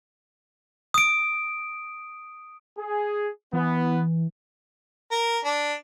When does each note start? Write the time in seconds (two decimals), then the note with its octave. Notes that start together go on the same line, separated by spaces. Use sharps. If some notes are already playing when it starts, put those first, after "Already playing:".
0.94 D#6 D7
2.78 G#4
3.53 E3 B3
5.11 A#4
5.45 D4